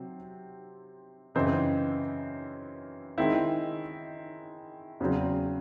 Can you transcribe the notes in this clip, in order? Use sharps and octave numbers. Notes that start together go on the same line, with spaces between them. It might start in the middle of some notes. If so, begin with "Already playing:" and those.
Already playing: C3 F#3 C4
F#2 C#3 E3 C4 D#4
D#3 G#3 C4 E4
E2 C#3 F#3 C4